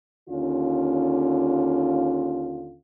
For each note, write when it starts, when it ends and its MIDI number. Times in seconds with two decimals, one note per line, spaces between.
0.29 2.76 39
0.29 2.76 50
0.29 2.76 61
0.29 2.76 65